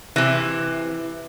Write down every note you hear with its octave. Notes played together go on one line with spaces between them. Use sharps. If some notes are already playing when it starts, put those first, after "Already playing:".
C3 E3